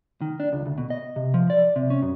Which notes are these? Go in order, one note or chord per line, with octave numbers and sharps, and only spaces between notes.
D#3
D4
C#2
D2
B2
D#5
C3
F3
D5
C3
C#4
F#2